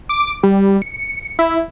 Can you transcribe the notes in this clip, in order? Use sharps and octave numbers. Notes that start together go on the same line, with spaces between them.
D6
G3
C#7
E4